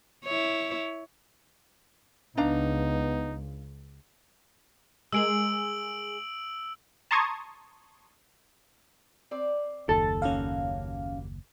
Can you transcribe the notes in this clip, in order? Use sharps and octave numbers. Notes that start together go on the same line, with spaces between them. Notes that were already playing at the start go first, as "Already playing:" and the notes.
E4 C#5
C#2 B3 D4 D#4 F5 A#5
G#3 G#4 A#4 E6 D7 F#7
A5 A#5 C6 C#6 D#6 G#6
C4 D5
F#1 D#2 A4 A6
G3 A#3 C#4 F#4 F5